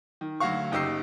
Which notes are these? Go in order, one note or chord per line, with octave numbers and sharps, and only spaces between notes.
D#3
D2 F#3 F#4 F5 C#6
F#1 D#4 G4 E6 C7